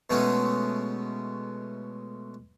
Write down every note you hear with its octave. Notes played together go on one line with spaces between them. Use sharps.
B2 G#3 A3 B3 C#4